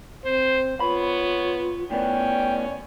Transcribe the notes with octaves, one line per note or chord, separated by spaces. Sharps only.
C4 C5
B3 F4 C#5 B5
A2 B3 C#4 D5 G5